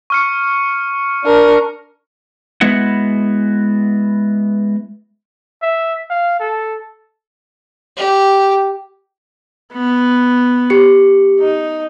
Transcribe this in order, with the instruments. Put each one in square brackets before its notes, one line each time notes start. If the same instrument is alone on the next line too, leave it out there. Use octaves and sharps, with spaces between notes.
[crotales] C#6 F6 C#7
[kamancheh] D4 A#4
[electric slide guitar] G#3 B3 E4 F#4 F#5
[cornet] E5
F5
A4
[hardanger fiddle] G4
[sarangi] B3
[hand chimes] G4 C#7
[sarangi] D#4